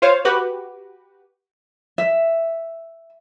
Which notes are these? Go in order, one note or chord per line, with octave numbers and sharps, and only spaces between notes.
F4 C5 C#5 F5
F#4 G4 B4
E5